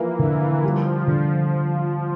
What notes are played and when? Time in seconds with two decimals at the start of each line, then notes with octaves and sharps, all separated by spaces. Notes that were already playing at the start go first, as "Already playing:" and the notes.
Already playing: E3 F3 A#3
0.19 D3 E3
0.64 F3 G3
1.07 D3